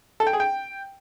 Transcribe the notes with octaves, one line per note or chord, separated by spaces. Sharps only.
A4
G5
G#4
G5